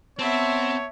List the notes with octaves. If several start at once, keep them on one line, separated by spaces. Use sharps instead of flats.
B3 C4 C#5 E5 A5